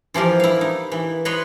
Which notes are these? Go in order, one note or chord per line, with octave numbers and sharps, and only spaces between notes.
E3 F3 G4 A#4
E4 F5
D#4
E3
B4 C#5 D#5 B5 C6